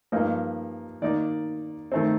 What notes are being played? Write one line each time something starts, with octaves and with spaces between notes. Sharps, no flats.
G2 F3 A#3 D#4
D#3 A#3 D#4 D5
D#3 A3 C4